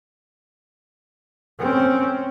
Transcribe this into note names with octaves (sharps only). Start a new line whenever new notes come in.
C4 C#4